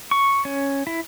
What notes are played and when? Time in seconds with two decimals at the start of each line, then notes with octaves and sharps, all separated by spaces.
0.11 C#6
0.45 C#4
0.87 E4